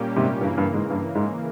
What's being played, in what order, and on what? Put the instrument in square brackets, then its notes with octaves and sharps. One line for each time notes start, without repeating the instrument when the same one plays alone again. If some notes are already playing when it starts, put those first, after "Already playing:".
Already playing: [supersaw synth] A#2 G3 A#3 C#4 G4
[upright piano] G#2 C3
[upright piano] G2 [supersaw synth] C#3 E3 A#3
[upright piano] G2
G#2
G2
G#2